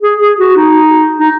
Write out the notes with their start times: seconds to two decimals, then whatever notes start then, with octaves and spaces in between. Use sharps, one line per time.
0.02 G#4
0.21 G#4
0.39 F#4
0.56 D#4
1.20 D#4